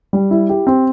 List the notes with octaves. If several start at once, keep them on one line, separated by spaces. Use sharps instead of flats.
G3
E4
G4
C4